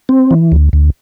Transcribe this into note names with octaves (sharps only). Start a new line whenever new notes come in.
C4
E3
D2
D2